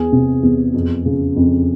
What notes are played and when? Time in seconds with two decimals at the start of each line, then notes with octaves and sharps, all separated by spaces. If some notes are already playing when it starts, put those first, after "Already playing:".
Already playing: E2 G#4
0.12 C3
0.43 E2
0.74 F2
1.05 C#3
1.36 F2